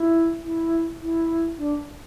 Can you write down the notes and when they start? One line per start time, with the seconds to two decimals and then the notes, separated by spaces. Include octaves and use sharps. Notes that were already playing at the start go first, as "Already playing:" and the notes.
Already playing: E4
0.42 E4
1.00 E4
1.58 D4